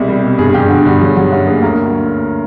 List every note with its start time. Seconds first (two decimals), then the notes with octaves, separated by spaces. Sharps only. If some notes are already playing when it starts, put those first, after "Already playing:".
Already playing: C2 B2 G#4
0.08 G3
0.23 B2
0.39 G2 G#4
0.49 G#4
0.54 G2 G4
0.70 D3 F#4
0.85 G2
1.00 F#3 G#4
1.16 F#3 F#4
1.32 F#2 F#4
1.47 A#3 G#4
1.62 D2 A#4